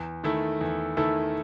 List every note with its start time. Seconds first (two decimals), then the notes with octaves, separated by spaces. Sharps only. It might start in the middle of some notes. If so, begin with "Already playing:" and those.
Already playing: E2
0.24 D#3 A3 E4 A4
0.61 E2
0.97 D#3 A3 E4 A4